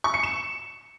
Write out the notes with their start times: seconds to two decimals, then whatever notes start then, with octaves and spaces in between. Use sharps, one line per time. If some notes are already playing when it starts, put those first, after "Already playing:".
0.04 C#6
0.14 C#7
0.23 E7